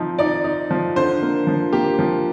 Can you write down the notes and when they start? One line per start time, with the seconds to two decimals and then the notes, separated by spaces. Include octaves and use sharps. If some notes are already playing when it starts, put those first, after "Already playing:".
Already playing: F3 C4 D#4
0.18 D#4 D5
0.44 D#4
0.71 F3
0.96 D3 C5
1.22 A#3
1.47 F3
1.73 A#3 G4
1.99 F3